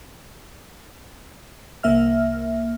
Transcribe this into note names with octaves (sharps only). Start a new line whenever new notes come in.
C2 A#3 E5 F6